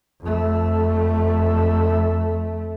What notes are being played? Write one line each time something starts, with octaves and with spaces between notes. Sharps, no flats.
F2 A3